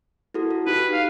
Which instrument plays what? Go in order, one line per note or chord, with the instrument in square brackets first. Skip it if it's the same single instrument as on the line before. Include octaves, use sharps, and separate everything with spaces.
[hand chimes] E4 F#4 A4
A4
[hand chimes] D#4 G4 [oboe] B4
[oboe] F5